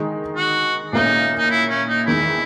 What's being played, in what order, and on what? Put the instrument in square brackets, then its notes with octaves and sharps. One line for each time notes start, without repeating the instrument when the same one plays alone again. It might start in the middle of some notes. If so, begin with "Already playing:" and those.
Already playing: [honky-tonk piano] D#3 G#3 D#4
[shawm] F#4
[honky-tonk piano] A#2 A#3 C#4 E4 [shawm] D#4
[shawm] D#4
E4
C#4
D#4
[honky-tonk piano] E2 D#3 G#3 [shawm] E4